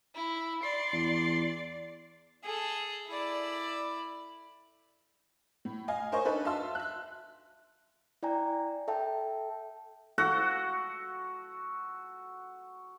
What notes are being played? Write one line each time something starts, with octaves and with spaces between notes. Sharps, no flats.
E4
D5 C6
E2
G#4 A4
E4 D5
A2
D#5 F5 G#5
A#4 C5 C#5 D#5 G#5 C#6
D4 D#4 A4 B4
E5 F5 A5 C6 E6
E5 F#6
E4 D5 G5 G#5 A#5
A4 E5 G5 A5
F#4 A4 F#5